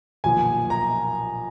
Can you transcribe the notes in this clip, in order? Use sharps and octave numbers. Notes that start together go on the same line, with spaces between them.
B1 A#2 F3 G#5
A#5